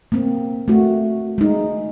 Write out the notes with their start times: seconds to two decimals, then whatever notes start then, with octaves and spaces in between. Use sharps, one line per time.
0.12 A#3 C4
0.68 A3 F#4
1.38 G#3 D#4